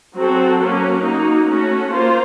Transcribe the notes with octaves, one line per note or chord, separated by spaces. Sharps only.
F#3 C4 F#4 A4
F#3 A#3 C#4
A#3 D#4 F#4
A3 C#4 F#4
A#3 F4 C5